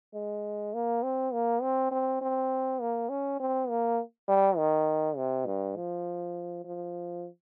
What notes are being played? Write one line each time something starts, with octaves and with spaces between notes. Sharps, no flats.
G#3
A#3
C4
A#3
C4
C4
C4
A#3
C#4
C4
A#3
G3
D#3
C3
G2
F3
F3